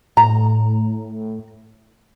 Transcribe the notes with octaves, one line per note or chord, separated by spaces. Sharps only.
A2 A#5